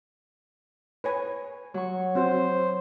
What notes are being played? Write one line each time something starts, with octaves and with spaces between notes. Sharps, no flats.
B4 C#5 G#5
F#3 C#6
C4 F#4 C5 C#5